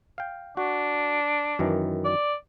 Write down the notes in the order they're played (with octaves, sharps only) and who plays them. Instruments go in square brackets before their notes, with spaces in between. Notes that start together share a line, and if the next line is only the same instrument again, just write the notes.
[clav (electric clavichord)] F5 G5
[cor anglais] D4 [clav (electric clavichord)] F#4
[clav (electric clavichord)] F#2 D#3 E3
[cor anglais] D5